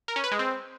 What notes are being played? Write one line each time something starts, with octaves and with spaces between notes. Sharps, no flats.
A#4
C#4
B4
G#3
C4